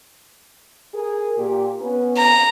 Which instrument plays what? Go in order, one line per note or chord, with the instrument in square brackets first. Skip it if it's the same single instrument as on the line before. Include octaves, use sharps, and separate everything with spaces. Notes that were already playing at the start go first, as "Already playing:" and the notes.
[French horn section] G#4 A#4
A#2 G4
B3 C#4 B4
[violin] A#5